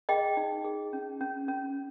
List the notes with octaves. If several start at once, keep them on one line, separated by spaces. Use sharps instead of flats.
G#4 D#5 G5
D#4
G#4
C#4
C#4
C#4